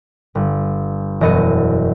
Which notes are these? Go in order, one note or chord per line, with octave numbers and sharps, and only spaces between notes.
G1
E1 F#2 D#5 A6 C#7